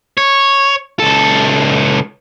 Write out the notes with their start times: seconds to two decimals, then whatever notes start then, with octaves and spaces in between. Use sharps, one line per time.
0.17 C#5
0.99 C#2 A4